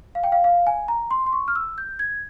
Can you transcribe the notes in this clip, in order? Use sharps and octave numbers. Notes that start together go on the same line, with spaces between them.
F5
G5
F5
F5
G#5
A#5
C6
C6
C#6
F6
E6
G6
G#6